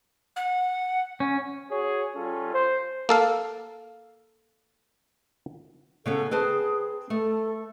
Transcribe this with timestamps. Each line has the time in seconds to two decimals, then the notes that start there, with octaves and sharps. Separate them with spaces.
0.36 F#5
1.20 C#4
1.70 F#4 G#4 C#5
2.15 G3 C#4 F4 A4
2.53 C5
3.09 A#3 A4 F5
6.06 C#3 B3 C#4 A4
6.31 C4 G#4 B4 A5
7.10 A3 A4